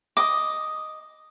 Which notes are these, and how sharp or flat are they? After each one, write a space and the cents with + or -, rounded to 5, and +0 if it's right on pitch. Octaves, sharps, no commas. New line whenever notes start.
D#5 +0 D6 +0